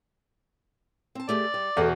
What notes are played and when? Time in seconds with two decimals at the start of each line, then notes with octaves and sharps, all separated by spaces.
1.15 C4 A5
1.29 A3 G4 G#4 D5
1.54 G3
1.77 E2 B2 A4 C5 D#5